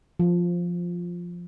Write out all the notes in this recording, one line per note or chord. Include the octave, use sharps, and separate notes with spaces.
F3